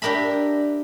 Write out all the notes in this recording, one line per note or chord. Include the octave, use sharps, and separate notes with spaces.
D4 G4 A#4 E5 B5